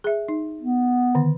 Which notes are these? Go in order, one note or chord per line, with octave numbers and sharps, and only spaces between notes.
G#4 E5
D#4
B3
D3 D#3